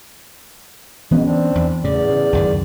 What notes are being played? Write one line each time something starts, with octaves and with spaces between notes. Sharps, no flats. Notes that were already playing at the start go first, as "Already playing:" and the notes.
B2 E3 G#3 B3 C#4
C4 D4
E2
E2 A2 C#3 D5
C#3
C#2 F#2 D#3